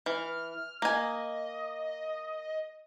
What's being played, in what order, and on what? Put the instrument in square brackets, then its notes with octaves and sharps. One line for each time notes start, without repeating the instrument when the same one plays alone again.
[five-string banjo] E3 [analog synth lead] F6
[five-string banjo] A#3 G#5 [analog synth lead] D#5